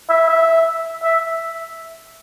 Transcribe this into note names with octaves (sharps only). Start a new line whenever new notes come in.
E5
E5
E5